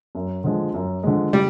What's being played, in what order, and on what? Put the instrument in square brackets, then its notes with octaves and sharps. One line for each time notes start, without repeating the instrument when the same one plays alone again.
[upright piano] F#2
D3 F3 G#3
F#2
D3 F3 G#3
[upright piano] C#3 [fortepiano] G3